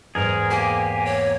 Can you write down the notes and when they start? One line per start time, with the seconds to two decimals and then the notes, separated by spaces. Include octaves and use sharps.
0.15 E2 G#2 G#4 A#4
0.51 A#3 G4 G#4 G#5
1.05 C#5